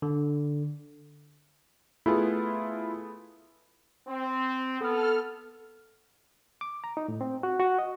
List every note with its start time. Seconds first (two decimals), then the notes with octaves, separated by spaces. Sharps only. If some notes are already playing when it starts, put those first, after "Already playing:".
0.02 D3
2.06 A3 B3 E4 F4 G#4
4.07 C4
4.81 B3 A4 F6
6.61 D6
6.84 A#5
6.97 D#4
7.08 A2
7.21 C4
7.43 F#4
7.60 F#4
7.79 D#5